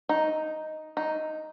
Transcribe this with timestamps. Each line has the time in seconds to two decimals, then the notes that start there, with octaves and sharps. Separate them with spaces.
0.09 D#4
0.97 D#4